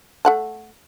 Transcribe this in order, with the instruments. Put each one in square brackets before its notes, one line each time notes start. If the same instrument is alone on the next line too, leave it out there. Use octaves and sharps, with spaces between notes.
[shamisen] A3 F#5 A5